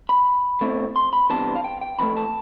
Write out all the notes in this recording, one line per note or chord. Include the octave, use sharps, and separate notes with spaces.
B5
B2 A3 C4 E4
C6
B5
C2 C3 E3 B3 D4 A5
F5
G5
G5
F2 E3 A3 B5
A5